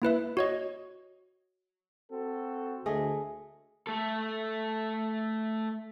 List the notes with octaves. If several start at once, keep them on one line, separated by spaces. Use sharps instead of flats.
A#3 E4 B4 E5
F#4 C#5 D#5
C4 F#4 A4
D2 A3 G#4 D#5
A3 A4